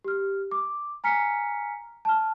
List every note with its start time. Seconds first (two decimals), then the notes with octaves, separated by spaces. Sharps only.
0.04 G4 F6
0.51 D6
1.04 G#5 A#5 F6 B6 C#7
2.05 A5 F6